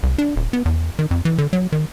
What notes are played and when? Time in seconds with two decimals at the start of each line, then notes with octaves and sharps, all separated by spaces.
0.03 C2
0.18 D4
0.36 D#1
0.53 B3
0.65 E2
0.99 D#3
1.11 F2
1.25 E3
1.38 D3
1.53 F#3
1.72 D#3